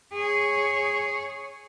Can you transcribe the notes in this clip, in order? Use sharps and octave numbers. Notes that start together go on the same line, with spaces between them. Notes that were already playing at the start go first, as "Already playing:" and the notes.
G#4 C#5